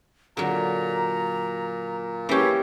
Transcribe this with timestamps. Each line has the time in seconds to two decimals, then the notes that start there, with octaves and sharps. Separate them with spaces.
0.37 A#2 D3 F#3 A#5
2.29 E3 A#3 C#4 G4